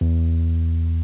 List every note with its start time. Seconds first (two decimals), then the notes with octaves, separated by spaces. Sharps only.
0.01 E2